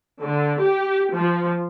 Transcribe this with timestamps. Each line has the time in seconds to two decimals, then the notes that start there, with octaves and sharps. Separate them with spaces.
0.23 D3
0.60 G4
1.14 F3